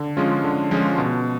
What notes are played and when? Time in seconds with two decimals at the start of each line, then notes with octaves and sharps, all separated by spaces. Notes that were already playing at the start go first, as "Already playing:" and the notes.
Already playing: D3
0.17 F3 G#3 C#4 F4
0.44 D3
0.71 F3 G#3 C#4 F4
0.98 B2